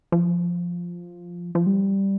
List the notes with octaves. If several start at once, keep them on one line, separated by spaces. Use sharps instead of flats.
F3
F3
G3